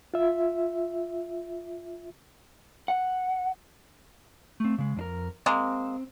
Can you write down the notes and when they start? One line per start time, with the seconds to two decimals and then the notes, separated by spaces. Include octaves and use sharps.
0.14 F4 E5
2.88 F#5
4.60 A3 C4
4.78 C#3 G#3
4.97 F2 D4 A#4
5.46 G#3 A#3 C4